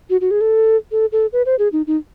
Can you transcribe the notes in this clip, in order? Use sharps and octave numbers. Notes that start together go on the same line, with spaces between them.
F#4
F#4
G#4
A4
A4
A4
B4
C5
G#4
D#4
D#4